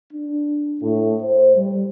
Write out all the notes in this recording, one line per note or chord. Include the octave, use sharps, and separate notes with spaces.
D4
A2
C5
G3